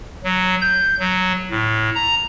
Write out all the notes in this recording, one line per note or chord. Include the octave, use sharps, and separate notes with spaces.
F#3
G6
F#3
A2
A#5